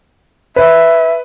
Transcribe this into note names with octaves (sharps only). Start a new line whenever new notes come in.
B4 E5